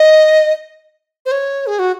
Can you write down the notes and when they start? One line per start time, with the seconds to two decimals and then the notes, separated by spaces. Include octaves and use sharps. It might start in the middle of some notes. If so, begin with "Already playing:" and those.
Already playing: D#5
1.26 C5
1.32 C#5
1.67 G#4
1.79 F#4